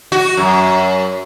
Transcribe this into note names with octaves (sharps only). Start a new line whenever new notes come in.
F#4
F#2